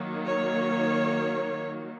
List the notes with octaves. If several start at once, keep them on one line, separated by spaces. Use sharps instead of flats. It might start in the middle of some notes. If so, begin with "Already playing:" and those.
Already playing: D#3 F#3 A#3
C#5